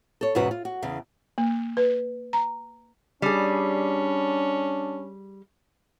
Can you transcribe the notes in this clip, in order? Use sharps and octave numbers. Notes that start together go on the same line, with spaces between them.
A4 C#5
E2 G#2 B2 C#4 F#4 B4
F4
F#4
E2 C#3
A#3
B4
A#5
G3 C#4 D4 G#4